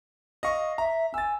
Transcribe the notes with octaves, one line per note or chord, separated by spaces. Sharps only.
D#5 F5 C#6
E5 A#5
G#5 E6 A6